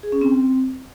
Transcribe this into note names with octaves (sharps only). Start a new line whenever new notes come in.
G#4
C#4
C4